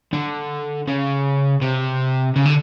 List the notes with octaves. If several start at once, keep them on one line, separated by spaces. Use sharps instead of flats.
D3
C#3
C3
C#3
D3